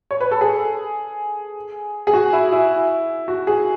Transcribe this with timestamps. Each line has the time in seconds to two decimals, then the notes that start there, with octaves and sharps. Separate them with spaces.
0.11 C#5
0.20 B4
0.31 A4
0.41 G#4
2.07 G#4
2.14 F#4
2.33 E4
2.52 E4
3.28 F#4
3.47 G#4